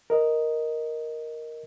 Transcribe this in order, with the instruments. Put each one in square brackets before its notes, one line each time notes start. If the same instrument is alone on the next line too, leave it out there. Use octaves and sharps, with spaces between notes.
[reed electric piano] A#4 D#5